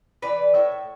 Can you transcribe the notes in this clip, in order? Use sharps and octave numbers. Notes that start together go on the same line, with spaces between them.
E3 B4 D5
A2 C#5 E5